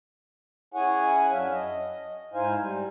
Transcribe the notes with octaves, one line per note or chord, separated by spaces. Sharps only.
C#4 E4 G#4 C#5 F#5 G#5
F#2 F#3 D4 E5 F5
D#5
G#2 D#4 E4 C5 F5 G#5
G3